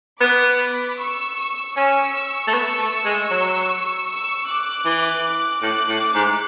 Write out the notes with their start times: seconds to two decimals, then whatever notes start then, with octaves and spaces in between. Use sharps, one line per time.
0.21 B3 B5 D6
0.99 C#6 E6
1.37 C#6 E6
1.76 C#4 C#6 E6
2.47 A3
2.53 B3 C#6 E6
2.79 A3
3.05 G#3
3.31 F#3
4.08 C#6 E6
4.47 D6 F#6
4.85 E3
5.62 A2 D6 F#6
5.89 A2
6.01 D6 F#6
6.15 G#2